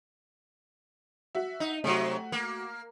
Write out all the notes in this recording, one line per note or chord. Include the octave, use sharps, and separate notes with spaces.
F#4 E5
D#4
C3 F#3 A3 F#4
A#3